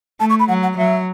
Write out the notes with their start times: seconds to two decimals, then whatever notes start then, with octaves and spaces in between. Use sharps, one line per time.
0.20 A3 A5
0.30 C#6
0.39 B5
0.48 F#3 F#5
0.63 F#5
0.77 F#3 E5